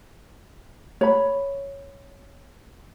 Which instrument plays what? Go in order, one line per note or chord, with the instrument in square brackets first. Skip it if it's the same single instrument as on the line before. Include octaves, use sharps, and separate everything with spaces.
[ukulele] C#5 B5